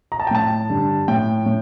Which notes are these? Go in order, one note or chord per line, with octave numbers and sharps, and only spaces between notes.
A#5
A5
G5
A2 A5
G2 D3
A2 G5
A2